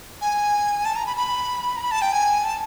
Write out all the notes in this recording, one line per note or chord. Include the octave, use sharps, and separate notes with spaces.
G#5
A5
A#5
B5
B5
A#5
B5
A5
G5
G#5
A5